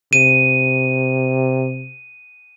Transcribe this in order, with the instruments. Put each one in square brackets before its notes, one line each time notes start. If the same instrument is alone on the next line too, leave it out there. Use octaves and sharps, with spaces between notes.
[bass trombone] C3 [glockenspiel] D#7